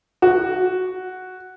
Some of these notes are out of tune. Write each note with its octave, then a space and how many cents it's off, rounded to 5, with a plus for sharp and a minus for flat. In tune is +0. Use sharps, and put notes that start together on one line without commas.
F#4 +0